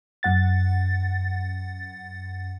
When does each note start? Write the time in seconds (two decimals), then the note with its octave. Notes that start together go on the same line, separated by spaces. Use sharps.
0.23 F#2 F#5 A6